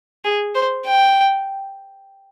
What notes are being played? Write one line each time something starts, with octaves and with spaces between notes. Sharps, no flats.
G#4
C5
G5